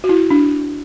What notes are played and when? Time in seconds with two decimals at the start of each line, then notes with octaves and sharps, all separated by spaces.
0.04 F#4
0.09 E4
0.30 D4